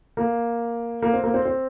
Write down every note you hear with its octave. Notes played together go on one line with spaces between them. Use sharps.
A#3
A#3
C4
A#3
C4
C4